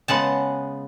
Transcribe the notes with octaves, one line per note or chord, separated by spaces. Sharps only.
C#3 G#3 B3 F#5 A5